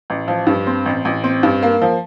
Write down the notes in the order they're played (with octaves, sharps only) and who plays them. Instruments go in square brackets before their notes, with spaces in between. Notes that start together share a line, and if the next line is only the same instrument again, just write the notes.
[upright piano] A1
F3
G2
C4
A1
A1
C4
G2
A#3
F3